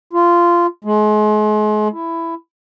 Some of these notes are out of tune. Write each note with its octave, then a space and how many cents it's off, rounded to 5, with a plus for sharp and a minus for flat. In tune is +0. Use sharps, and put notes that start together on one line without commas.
F4 -15
G#3 +35
E4 +10